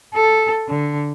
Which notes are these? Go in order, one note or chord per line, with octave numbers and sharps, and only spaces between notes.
A4
D3